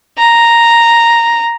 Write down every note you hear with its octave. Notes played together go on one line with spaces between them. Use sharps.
A#5